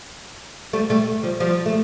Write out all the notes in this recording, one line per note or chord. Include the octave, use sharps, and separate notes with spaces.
G3 A3
G3 A3
F3 G3
F3 G3
A3